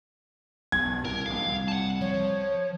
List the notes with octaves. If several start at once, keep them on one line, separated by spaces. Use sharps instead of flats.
B1 G2 G#6
C2 A#4
A#1 D#2 G#2 F5
C2
F#5 A5
F3 C#5